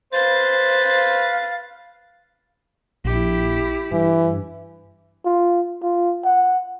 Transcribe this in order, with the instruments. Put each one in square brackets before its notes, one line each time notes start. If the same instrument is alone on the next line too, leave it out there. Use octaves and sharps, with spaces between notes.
[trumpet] B4 [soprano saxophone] C5 [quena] F5 [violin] A6
[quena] F5
[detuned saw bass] A#1 [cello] E4 G4
[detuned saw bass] G2 [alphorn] E3
[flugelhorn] F4
F4
F#5